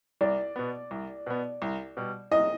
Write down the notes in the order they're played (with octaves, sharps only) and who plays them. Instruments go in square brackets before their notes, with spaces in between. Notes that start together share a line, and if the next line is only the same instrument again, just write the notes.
[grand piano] C2 [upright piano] D5
[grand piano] B2 B3
C2
B2 B3
C2
B2 G3
[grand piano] C2 [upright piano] D#5